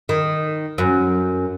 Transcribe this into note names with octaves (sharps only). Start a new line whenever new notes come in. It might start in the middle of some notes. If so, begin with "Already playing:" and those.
D#3
F#2